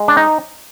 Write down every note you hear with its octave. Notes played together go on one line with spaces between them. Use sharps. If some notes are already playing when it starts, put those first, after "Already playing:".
Already playing: G#3
D4
D#4